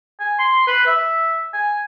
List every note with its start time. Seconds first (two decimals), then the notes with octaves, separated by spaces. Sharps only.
0.20 G#5
0.39 C6
0.67 B4
0.87 E5
1.53 G#5